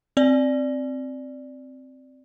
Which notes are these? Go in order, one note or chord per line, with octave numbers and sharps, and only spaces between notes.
C4 D5